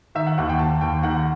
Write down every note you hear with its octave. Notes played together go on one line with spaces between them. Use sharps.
D#3 E5
F#5
D#2 F#5
G5
D#2 A5
D#2 G5
D#3 F#5